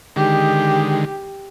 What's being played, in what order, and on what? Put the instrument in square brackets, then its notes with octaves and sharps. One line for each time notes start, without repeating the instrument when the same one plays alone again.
[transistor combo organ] D3 D#3 G#3 [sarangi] G4